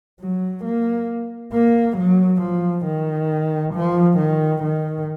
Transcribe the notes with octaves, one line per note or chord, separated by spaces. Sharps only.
F#3
A#3
A#3
F#3
F3
D#3
F3
D#3
D#3